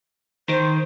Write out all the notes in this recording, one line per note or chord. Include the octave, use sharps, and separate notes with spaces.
D#3 C5